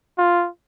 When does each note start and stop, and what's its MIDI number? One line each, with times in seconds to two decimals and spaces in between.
0.18 0.48 65